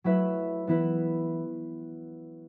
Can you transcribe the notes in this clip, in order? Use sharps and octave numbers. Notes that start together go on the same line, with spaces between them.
F#3 A3 E4 B4 E5
E3 B3 E4 B4